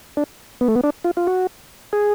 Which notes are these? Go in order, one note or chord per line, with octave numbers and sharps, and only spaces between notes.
D4
B3
A3
B3
D4
F4
F4
F#4
G#4